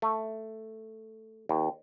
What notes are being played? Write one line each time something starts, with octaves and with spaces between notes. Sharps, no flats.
A3
D#2